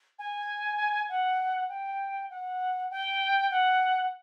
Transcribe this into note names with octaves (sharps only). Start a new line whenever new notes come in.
G#5
F#5
G5
F#5
G5
F#5